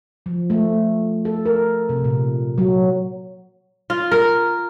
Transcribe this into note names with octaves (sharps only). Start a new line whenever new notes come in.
F3
A3
A4
A#4
C3
A#2
F#3
F4
A#4